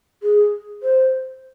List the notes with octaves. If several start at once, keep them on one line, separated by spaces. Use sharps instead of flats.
G#4
C5